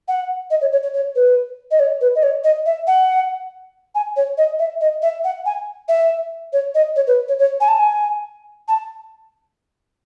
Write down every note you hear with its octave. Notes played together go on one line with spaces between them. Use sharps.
F#5
D#5
C#5
C#5
C#5
C#5
B4
D#5
C#5
B4
D#5
C#5
D#5
E5
F#5
G#5
C#5
D#5
E5
D#5
E5
F#5
G#5
E5
C#5
D#5
C#5
B4
C#5
C#5
G#5
A5
G#5
A5